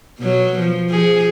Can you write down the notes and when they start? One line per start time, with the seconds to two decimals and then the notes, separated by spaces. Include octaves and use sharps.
0.19 B2 F#3
0.58 F3
0.90 F3 G#4